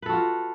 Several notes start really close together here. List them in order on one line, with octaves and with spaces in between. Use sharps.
B4 A4 F#4 F4